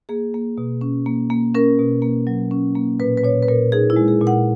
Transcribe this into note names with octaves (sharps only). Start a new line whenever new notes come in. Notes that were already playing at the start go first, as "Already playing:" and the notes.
A#3 G#4
A#3
B2
C#4
A#3
A#3
C#4 A#4
B2
A#3
F#3
C#4
A#3
A#2 B4
B4
A#2 C#5
B4
A#2 A#4
D#4 G#4
E4
G#3
G#4
A#2
F#5